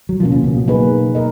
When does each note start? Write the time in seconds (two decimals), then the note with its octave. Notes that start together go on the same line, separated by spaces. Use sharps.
0.09 F#3
0.20 B2 F3 A#3 C#4
0.32 C#3
0.44 B2
0.56 B2
0.68 F#3 A#3 D#4 G#4 B4
1.15 A#4 D#5